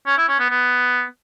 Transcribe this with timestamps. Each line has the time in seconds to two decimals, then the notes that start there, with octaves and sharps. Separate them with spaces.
0.07 C#4
0.17 E4
0.28 C#4
0.39 B3
0.50 B3